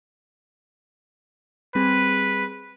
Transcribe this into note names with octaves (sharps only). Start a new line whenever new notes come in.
G3 C4 G#4 B4